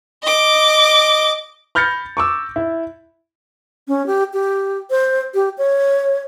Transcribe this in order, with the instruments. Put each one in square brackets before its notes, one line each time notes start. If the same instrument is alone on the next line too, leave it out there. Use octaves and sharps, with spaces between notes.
[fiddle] D#5 D6
[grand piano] B5 F6 G6 A6 A#6 C#7
C#6 D6 E6
E4
[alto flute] C#4
G4
G4
C5
G4
C#5